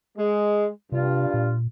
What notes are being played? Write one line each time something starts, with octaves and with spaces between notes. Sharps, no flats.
G#3
G2 C3 F4
A#2